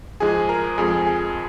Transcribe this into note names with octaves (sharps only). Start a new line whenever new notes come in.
G#2 F3 G#3 G#4 G#5
A#4 A#5
F2 F3 G#3 G#4 G#5
G#4 G#5